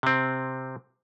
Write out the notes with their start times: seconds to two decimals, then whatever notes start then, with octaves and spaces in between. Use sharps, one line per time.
0.03 C3 C4